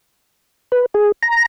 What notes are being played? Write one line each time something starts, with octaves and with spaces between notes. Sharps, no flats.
B4
G#4
A#5